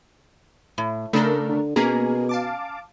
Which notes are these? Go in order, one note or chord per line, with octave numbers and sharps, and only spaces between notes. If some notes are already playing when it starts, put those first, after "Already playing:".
A2
C#3 A3 D4 A4 A#4
D3
B2 A#3 C#4 G#4 A#5
F5 A5 D6